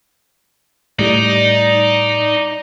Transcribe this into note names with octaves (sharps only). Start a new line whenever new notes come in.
A2 G3 D#4 D5